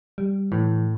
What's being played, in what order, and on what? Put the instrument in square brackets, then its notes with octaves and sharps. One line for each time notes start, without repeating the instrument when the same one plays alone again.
[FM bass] G3
[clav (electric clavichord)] A2 [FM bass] E3